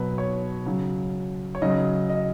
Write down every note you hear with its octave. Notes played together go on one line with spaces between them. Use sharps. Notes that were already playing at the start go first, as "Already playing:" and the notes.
Already playing: B2 F#3 B4
C#5
C#3 F#3
C#5
C#3 F#3 D#5
D#5